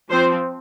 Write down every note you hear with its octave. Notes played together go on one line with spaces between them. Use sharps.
F3 C4 C5